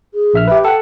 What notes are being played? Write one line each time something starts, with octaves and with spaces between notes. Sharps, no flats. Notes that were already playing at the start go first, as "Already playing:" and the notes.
G#4
A#1 E5 F6
G4 B4 E5
A4 F#5 G5